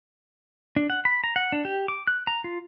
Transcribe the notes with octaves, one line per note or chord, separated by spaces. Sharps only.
D4
F#5
B5
A#5
F#5
D4
G4
D6
F#6
A#5
F4